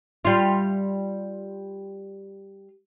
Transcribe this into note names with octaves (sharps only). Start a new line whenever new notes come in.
G3 F4